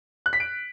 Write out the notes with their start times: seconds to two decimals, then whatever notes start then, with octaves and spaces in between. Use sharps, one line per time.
0.26 F#6
0.33 B6
0.40 D7